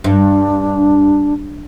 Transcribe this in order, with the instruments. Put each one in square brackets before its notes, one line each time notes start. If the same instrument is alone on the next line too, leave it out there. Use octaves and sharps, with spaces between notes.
[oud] G2 [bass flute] D4